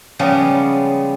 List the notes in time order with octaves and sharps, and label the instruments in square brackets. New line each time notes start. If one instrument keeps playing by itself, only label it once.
[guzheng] C#3 F3 G3 G#3 B3